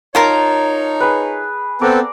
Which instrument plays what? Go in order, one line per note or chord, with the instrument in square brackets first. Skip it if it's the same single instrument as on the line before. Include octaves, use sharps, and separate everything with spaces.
[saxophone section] D#4 C#5 [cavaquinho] F4 A#4 A#5 [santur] A5
[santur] G#4 B4
[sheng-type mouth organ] B3 C4 A4 [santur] D5 A#5